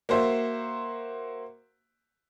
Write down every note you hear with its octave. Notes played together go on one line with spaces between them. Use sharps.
A#3 F#4 C5 E5